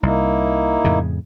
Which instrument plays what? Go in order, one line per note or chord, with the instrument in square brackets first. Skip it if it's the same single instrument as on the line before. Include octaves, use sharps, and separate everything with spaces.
[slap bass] C2 [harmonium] A#3 D#4 E4
[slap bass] F2 A2 C#3